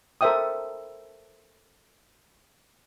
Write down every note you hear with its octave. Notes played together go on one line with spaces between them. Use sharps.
A4 A#4 C5 E5 G5 D#6